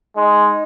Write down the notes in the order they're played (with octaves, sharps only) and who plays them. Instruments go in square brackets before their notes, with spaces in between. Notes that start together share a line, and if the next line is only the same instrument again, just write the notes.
[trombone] G#3 [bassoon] D#4